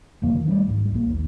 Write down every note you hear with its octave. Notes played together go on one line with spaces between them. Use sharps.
E1 C2 F2 A#3
D#3
G3 A3 D4
C#2 G#2
A#1 A#3
D#2